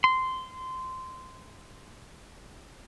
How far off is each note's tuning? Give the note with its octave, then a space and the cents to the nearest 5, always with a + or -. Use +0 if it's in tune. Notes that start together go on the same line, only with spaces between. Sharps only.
C6 -15